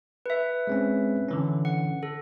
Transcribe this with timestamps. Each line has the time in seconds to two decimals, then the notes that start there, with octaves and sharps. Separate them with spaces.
0.26 B4 E5
0.67 G#3 C4 C#4
1.29 D3 E3 C#4
1.65 F#5
2.03 A4